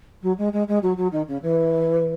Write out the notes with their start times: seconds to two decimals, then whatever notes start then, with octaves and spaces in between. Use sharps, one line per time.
0.22 F#3
0.38 G#3
0.52 G#3
0.68 G#3
0.82 F#3
0.97 F#3
1.12 D#3
1.27 C#3
1.42 E3